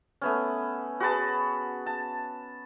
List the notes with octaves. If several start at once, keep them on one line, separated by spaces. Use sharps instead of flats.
A3 B3 C#4
F#4 G#4 B4 A5
A5